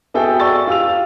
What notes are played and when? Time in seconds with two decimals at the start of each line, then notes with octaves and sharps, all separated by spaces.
0.14 B3 F#4 G#4 A4 E5 G5
0.40 D5 C#6 E6 A6
0.67 F4 G4 E6 F7